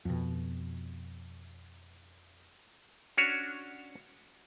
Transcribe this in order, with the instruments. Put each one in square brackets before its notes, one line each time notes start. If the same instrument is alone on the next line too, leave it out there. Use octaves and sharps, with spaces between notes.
[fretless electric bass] F2 B2
[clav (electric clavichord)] C#4 D4 F#4 C#5